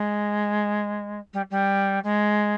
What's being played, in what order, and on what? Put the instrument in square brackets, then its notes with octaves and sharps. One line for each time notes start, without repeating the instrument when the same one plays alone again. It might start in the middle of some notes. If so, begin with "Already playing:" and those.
Already playing: [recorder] G#3
G3
G3
G#3